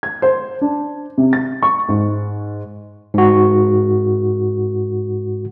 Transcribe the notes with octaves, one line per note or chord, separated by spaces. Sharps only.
G#6
C5
D4
C3
A6
C#6
G#2
G#2 F#4